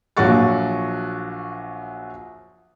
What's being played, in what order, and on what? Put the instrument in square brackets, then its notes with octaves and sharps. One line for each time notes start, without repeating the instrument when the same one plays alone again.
[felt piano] A#1 F3 F#3 F#4 C#6 A6